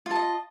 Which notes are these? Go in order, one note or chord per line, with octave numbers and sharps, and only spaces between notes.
F4 D#5 A5